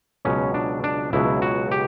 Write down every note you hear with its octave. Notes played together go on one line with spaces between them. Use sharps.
C#2 B2 F#3 C#4
D4
D4
C#2 B2 F#3 E4
F#4
G4